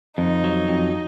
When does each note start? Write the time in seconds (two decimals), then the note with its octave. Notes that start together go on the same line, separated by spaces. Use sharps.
0.18 F2 D#4
0.44 F#3
0.68 F2